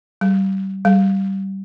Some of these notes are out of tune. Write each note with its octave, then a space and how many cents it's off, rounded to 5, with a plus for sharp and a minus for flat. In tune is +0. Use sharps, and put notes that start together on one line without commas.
G3 -25
G3 -15